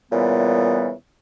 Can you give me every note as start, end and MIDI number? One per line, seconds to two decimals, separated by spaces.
0.12 0.91 46
0.12 0.91 49
0.12 0.91 52
0.12 0.91 55
0.12 0.91 59